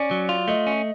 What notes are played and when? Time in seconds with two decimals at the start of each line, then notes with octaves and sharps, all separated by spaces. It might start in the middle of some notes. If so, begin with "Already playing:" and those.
Already playing: C#4 D5
0.11 F#3
0.29 F4
0.48 A3 D#5
0.67 C#4